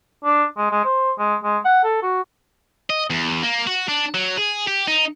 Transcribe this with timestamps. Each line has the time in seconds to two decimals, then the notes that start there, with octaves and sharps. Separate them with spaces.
0.25 D4
0.57 G#3
0.71 G#3
0.85 C5
1.19 G#3
1.43 G#3
1.65 F#5
1.84 A4
2.03 F#4
2.90 D#5
3.10 E2
3.43 A#3
3.67 F#4
3.88 D4
4.14 F#3
4.37 G#4
4.67 G4
4.88 D#4